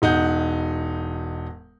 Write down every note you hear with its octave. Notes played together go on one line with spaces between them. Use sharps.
E1 D#4 F#5 G6